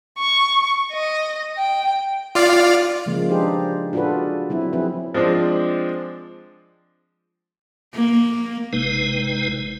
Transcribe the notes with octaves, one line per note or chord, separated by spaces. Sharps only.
C#6
D#5
G5
F4 D5 F5
C#3 F3 G#3 A#3
D4 D#4 G4 G#4 B4 C5
D4 F4 F#4 G#4 A4 B4
F#3 C4 E4
F3 C4 E4 G#4 B4
F3 G#3 C4 D4
A#3
G1 C3 G#3 D#4 B4